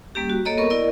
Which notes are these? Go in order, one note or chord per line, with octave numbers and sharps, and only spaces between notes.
G3 A#3 C#4 G4
F#4
A#3 A4 C#5 D#5 A#5
B3 A#4 C#6
E4 A#4 D5 D#5